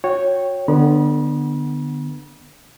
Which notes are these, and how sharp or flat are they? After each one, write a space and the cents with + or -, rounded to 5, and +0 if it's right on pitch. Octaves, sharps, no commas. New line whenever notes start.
F#4 -30 C#5 -10 G5 +0
D3 +25 B3 +0 B5 -40